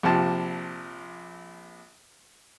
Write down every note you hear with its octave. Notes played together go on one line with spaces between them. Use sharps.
A#1 C3 F3 A5